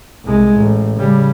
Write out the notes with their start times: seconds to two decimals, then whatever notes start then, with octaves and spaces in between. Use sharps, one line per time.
0.25 C2 G#3
0.56 A1
0.96 C#3 G3